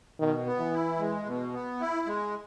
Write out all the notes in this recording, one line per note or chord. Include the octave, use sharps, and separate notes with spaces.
B2 D#3
B3
E3
E4
G#3
B2
B3
E4
G#3